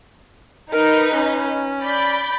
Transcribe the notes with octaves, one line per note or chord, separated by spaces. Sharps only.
D#4 A#4 B4
C#4
D5 B5 G6